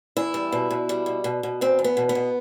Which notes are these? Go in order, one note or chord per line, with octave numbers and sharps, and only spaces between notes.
E2 E4
G3
B2
B2
G3
B2
B2
B2
E2 C4
E2
B3
B2
B3
B2